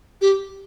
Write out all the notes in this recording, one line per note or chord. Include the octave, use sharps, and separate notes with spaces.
G4